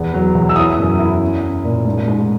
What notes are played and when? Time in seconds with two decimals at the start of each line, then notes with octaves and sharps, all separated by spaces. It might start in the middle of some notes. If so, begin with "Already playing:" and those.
Already playing: E2 B3
0.14 F#3
0.35 E2
0.49 E6
0.56 E4 D#6
0.79 F#2
0.99 E4
1.21 C#4
1.43 C#4
1.64 A#2
1.85 G#2
2.08 G#2